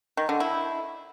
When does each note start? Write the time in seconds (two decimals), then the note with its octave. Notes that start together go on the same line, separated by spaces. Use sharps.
0.17 D#3
0.29 D3
0.40 E4